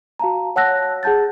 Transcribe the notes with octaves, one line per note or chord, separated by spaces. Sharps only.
F#4 F5 A5 A#5
C#5 F#5 A5 E6 F#6 A#6
G#4 F#5 A5 G6 A6